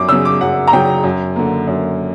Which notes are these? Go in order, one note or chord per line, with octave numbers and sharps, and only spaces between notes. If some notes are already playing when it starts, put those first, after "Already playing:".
Already playing: F#2 D6
C#3 F#3 C#4 E6
D6
F#2 F#5
A#5
C#3 F#3 C#4 G5
F#2
D3 A#3
F#2